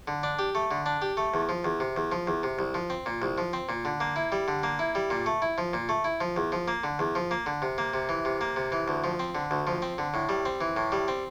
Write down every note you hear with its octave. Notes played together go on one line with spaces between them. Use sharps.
D3
D4
G4
A3
D3
D4
G4
A3
E2
F3
E2
C3
E2
F3
E2
C3
C2
F3
C4
A#2
C2
F3
C4
A#2
D3
A#3
E4
G3
D3
A#3
E4
G3
A#2
A3
E4
F3
A#2
A3
E4
F3
E2
F3
A#3
D3
E2
F3
A#3
D3
C3
A#3
C3
E3
C3
A#3
C3
E3
D2
F3
C4
D3
D2
F3
C4
D3
A2
G3
C4
E3
A2
G3
C4